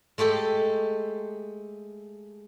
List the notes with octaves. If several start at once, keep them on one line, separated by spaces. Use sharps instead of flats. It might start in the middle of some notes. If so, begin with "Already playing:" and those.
G#3 A3 G4 A4